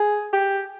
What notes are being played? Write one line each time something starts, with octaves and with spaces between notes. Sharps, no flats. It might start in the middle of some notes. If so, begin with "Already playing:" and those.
Already playing: G#4
G4